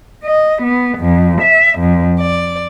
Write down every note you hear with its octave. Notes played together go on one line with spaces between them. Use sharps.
D#5
B3
F2
E5
F2
D5